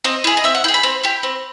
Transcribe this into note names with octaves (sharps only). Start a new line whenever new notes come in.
C4 D#5
E4 G#4
D#5
C4 E5
F#5
E4 G5
G#4
B5
C4
E4 G4
C4